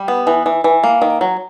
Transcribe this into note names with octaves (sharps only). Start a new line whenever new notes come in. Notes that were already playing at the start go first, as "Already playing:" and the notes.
Already playing: G3
B3
E3
E3
E3
A#3
D#3
F#3